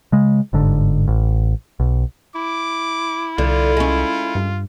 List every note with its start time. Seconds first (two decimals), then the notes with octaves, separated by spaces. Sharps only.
0.12 C#3 G#3
0.53 G1 G#2 D3
1.08 A1
1.80 B1
2.35 E4 D6
3.38 C2 D3 F4
3.77 G#3 C#4
4.35 G2